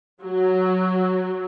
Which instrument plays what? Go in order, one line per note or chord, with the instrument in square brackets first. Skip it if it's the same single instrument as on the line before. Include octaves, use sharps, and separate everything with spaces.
[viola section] F#3